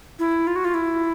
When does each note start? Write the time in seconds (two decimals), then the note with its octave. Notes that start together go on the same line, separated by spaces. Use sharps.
0.19 E4
0.47 F4
0.56 F#4
0.65 F4
0.74 E4